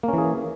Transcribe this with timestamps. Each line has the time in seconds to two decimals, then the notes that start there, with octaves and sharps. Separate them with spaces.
0.03 A#3
0.08 C#4
0.13 E3
0.18 G#4